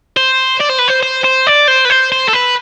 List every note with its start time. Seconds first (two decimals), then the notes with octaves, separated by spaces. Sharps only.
0.16 C5
0.60 D5
0.69 C5
0.78 B4
0.88 C5
1.03 C5
1.24 C5
1.47 D5
1.68 C5
1.85 B4
1.90 C5
2.12 C5
2.28 A4
2.33 B4